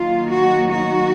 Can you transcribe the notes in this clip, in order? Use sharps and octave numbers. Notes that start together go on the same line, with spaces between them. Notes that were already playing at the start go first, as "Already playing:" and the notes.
Already playing: D#3 F#3 A#3 D#4 F4
F#4
F#4